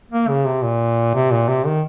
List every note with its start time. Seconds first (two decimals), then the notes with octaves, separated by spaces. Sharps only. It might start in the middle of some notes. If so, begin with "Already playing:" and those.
0.11 A#3
0.28 C#3
0.46 C3
0.63 A#2
1.14 C3
1.31 A#2
1.48 C3
1.66 D#3